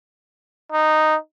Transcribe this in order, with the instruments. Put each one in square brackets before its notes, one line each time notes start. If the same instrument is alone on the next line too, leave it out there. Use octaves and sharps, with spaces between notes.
[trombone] D#4